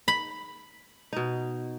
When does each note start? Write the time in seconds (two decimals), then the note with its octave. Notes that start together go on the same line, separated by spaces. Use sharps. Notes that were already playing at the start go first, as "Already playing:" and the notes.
0.08 B5
1.13 B2 D#4